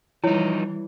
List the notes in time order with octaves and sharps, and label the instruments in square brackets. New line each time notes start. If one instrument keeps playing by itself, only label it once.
[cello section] E3 G3 [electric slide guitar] F3 D#4 [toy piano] E4 C#5